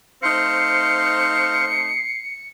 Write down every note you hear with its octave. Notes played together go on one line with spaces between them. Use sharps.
A3 C4 D#4 C5 F5 C7 C#7